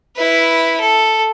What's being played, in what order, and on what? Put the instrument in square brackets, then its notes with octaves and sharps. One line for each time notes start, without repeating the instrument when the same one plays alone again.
[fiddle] E4 B4
A4